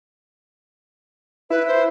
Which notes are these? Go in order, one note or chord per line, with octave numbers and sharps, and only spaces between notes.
E4 B4
C5